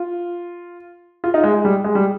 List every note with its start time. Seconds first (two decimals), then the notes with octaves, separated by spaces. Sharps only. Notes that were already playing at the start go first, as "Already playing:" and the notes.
Already playing: F4
1.24 F4
1.34 D#4
1.44 G#3
1.54 G#3
1.65 G3
1.84 G#3
1.95 G3